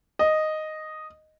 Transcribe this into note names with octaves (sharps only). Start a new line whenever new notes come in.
D#5